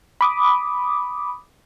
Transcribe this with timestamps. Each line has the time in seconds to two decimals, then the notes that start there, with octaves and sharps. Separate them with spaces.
0.21 B5 D6 D#6